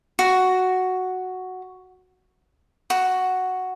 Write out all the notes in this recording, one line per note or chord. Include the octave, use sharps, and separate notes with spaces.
F#4
F#4